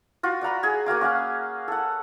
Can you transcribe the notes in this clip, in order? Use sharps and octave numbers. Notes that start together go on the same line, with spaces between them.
F4 F#4
D5 F#5 A#5 B5
G#4 G#5
A#3 F#4 F5 D6
C#4 F5 F#5 G#5
A4 F#5